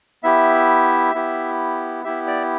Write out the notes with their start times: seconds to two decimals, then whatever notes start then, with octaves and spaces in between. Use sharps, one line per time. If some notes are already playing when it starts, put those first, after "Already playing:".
0.23 B3 E4 G4 E5
1.15 B3 E4 G4
2.04 B3 E4 G4 E5
2.27 D5